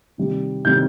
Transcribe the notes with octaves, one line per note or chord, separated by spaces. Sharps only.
C3 D#3 G3
C3 D#3 G3 G6